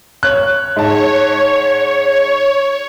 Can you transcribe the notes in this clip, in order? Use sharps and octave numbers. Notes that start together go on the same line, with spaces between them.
C#5 F#6
G#2 C#5 A5